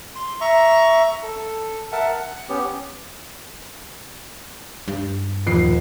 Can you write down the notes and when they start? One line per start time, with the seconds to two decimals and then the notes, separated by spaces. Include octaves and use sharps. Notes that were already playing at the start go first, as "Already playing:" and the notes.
0.16 C6
0.41 E5 A#5 C#6
1.23 A4
1.92 A#4 E5 F#5 A5
2.13 F#5
2.49 B3 C#4 G4
4.88 G2
5.46 D#1 F2 C7